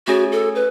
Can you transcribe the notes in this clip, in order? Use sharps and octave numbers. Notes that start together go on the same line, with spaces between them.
A3 C#4 F#4 G#4 C#5
A4
B4